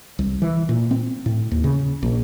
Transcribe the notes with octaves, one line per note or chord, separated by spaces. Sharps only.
C2
E3
A#2
C4
A2
D#2
C#3
A#1